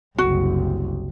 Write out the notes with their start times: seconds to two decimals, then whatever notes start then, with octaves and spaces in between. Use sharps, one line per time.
0.18 F#1 C2 F#4